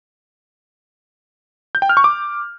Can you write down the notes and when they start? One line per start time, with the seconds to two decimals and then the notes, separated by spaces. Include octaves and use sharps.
1.75 G6
1.82 G5
1.89 F6
1.97 C#6
2.04 D6